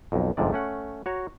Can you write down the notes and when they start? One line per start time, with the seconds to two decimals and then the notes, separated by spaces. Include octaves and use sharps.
0.12 B1 F2
0.37 G1 F2 G#2 C3 D5
0.52 A3 C#4 F#5
1.06 F#4 C#5 A#5